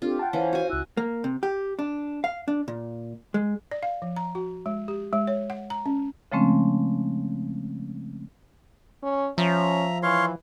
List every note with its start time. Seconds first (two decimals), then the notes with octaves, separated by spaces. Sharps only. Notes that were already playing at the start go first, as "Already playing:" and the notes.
0.02 C4 D4 F4 G4 A4
0.19 F#5 G5 A5
0.33 E3 C#4 C5 C#5 F5
0.53 F#4 G#5
0.70 C#2 E4 E6 F#6
0.97 A#3
1.24 C3
1.43 G4
1.79 D4
2.24 F5
2.48 D4
2.68 A#2
3.34 G#3
3.71 D5
3.83 F5
4.02 F3
4.16 A#5
4.35 F#4
4.66 G#3
4.88 G4
5.13 G#3
5.27 C#5
5.50 F#5
5.70 A#5
5.86 C#4
6.32 C#3 F3 G#3 A3 C4 C#4
9.03 C#4
9.38 F3 C#4 E5 A#5
10.03 E3 C#5 F5 C6